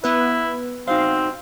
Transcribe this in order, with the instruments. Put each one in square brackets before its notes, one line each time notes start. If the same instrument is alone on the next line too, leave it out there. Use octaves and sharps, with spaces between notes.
[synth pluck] B3 B4 [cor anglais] E4
[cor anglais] C4 [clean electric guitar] D#4 F#4 C5 [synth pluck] F5